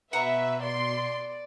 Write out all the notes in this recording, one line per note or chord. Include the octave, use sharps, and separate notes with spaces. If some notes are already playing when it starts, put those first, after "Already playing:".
B2 B4 E5 F#5 A#5 C#6
D5 C6